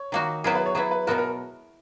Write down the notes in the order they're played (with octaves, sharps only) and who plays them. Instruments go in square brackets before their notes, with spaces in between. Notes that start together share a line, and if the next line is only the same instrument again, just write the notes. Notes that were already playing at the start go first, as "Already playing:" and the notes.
Already playing: [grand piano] C#5
[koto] D#3 A#3 D#4 F#4
[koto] F#3 B3 E4 G#4 [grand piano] A#4
[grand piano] B4
C#5
[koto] F#3 B3 E4 G#4 [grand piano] B4
[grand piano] B4
[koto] B2 F#3 B3 F#4 [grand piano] A#4
[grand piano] A#4